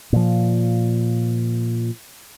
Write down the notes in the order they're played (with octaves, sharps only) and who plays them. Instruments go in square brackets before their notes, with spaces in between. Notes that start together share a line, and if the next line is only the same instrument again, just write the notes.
[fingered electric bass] A#2 F3